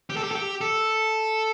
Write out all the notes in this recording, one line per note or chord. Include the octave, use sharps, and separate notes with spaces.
G4
A4
G4
A4
G4
A4